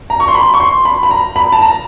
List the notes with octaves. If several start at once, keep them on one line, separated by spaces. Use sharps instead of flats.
A#5
C#6
C6
B5
C#6
C6
B5
B5
A#5
B5
A5
A#5